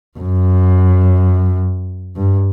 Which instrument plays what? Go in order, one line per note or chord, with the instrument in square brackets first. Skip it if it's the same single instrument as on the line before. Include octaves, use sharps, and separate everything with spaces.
[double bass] F#2
G2